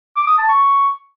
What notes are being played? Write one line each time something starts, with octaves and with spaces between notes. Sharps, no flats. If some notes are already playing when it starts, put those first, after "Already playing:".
D6
D#6
A5
C#6